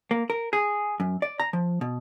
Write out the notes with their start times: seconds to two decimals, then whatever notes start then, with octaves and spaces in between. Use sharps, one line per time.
0.11 A#3
0.30 A#4
0.53 G#4
1.00 F#2
1.22 D5
1.40 A#5
1.53 F3
1.81 B2